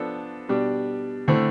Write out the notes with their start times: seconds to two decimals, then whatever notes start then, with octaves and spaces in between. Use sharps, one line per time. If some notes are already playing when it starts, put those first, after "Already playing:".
Already playing: F3 B3 D4 A4
0.49 B2 G3 D4
1.28 D3 A3 C4 E4